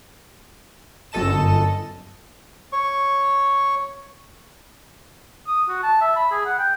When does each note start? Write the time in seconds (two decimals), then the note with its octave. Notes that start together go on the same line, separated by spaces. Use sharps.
1.12 G1 F#2 A4 D#5 A5 E7
2.73 C#5 C#6
5.47 D#6
5.69 F#4
5.83 A5
6.01 E5
6.16 B5
6.31 G#4
6.45 F#5
6.59 G5